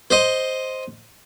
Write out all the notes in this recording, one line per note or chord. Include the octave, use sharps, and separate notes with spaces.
C5 D#5